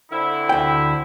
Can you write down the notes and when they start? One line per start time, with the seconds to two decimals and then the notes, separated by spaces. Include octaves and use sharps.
0.11 D3 C4 E4
0.49 D2 G5